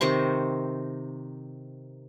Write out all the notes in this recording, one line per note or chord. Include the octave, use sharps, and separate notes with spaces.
C3 D#3 C5 C#6